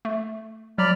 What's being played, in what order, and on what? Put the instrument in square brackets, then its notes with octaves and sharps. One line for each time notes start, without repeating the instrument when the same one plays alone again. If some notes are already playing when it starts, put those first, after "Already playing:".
[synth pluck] A3
[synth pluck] F#3 [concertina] D5 B5 F6